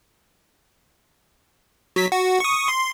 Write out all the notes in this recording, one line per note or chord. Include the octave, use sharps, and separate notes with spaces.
F#3 B6
F#4
C#6 D#6
C6